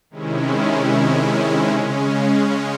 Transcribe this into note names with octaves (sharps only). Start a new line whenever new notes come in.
C3 D#3 G#3 C#4 E4
C#3 G#3 C#4